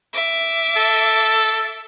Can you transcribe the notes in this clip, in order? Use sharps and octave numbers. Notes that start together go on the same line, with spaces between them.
E5 D6
A4